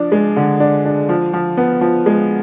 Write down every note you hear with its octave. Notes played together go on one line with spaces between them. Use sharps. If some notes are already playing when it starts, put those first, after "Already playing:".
Already playing: F3 D4
G#3
D3
D4
D4
F3
F3
B3
F3
G#3